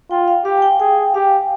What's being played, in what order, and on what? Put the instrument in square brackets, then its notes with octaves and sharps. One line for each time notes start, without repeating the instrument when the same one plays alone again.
[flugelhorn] F4 [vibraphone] G5
[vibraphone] F5
[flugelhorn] G4 [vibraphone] F5
[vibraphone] G#5
G5
[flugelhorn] G#4 [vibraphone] G5
[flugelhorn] G4 [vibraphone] F5